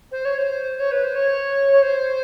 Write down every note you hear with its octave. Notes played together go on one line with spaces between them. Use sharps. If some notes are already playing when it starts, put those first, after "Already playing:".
C5
C#5
C5
C#5
B4
C5
C#5
C#5
C5